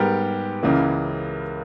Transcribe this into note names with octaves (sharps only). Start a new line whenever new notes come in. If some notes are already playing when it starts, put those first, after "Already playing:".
Already playing: G#2 G3 B3 G4 A#4
C#2 C#3 E3 A#3